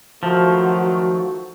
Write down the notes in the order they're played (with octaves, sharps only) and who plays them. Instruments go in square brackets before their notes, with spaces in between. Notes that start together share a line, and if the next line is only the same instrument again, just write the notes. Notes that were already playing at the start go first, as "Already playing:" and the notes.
[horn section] D#3 F#3 A3 [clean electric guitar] F3 [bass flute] F#4